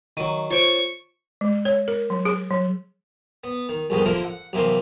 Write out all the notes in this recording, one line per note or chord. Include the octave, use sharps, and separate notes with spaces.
D#3 F#3 D#7
F4 C5 C#5 C#6 D7
G#3
C#5
A#4
F#3
G#4
F#3
B3
D#3
C2 F2 B2 D#3 G#3
D3 F3 A#3 E4 A#4
F#5
B1 C3 E3 A#3 C6